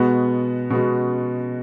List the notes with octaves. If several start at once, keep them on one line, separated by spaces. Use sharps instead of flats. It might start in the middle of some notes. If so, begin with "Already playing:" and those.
Already playing: B2 G#3 B3 F#4
B2 G#3 B3 F#4